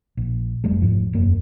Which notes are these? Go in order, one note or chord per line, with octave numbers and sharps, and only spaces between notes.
A#1
F#1 F2 G3 A3
F1 G#2 F3
E1 F#2 A#3